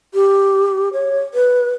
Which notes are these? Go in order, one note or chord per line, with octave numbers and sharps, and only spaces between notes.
G4
C#5
B4